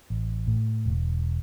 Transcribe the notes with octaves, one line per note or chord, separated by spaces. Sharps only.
A1
A2
E1